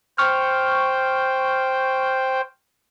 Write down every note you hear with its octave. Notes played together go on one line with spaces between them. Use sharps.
C5 G5 C#6 F6